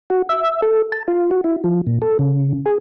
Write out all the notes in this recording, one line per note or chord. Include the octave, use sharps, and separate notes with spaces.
F#4
E5
A4
A5
F4
F#4
E4
F3
A#2
A4
C#3
G#4